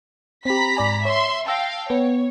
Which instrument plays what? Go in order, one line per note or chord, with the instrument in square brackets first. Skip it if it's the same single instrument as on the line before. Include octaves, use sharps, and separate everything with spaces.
[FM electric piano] C4 G4 [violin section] A#5 B5 B6
[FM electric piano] G#2 D5 G#5
[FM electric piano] C#5 [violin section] E5 C6
[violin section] F5 G5 [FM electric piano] A5 E6 A#6
[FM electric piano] B3 [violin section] C#5